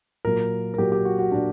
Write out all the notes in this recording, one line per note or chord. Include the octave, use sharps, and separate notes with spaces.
A#2 F#3 A#3 A#4
A#4
A#2 F#3 A#3 G4
G4
F#4
F#4
A#2 F#3 A#3 D4